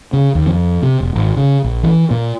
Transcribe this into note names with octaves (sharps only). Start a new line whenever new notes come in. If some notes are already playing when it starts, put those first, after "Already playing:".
C#3
D#2
F2
C3
E1
G#1
C#3
A#1
E3
A#2